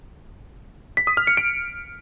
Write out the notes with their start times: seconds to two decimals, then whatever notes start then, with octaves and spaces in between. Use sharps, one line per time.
0.97 B6
1.07 D#6
1.17 F6
1.27 C#7
1.37 D7